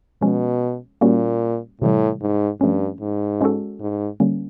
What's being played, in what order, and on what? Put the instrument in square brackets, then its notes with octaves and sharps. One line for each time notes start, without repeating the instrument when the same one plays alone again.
[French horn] B2 [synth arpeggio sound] F3 G#3 C#4
[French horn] A#2 [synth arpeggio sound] G3 A#3 C#4 F#4
[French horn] A2 [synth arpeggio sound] C3 E3 G3
[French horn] G#2
[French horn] G2 [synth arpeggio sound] F3 A3 C#4
[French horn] G#2
[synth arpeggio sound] G#3 C#4 F#4 A4
[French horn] G#2
[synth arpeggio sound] D3 G3 A#3 C#4